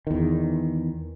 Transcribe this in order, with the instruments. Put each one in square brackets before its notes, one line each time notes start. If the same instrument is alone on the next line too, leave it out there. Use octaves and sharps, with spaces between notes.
[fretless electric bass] E2 D#3